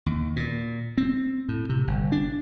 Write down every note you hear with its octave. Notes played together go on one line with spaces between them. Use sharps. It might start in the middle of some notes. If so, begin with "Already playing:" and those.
D#2
A#2
C4
A2
C3
G1
D4